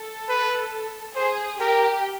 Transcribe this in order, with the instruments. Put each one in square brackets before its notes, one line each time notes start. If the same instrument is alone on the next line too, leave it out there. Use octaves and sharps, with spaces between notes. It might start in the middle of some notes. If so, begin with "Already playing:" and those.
Already playing: [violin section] A4
[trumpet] B4
[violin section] G#4 [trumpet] C5
[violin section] G4 [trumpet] A#4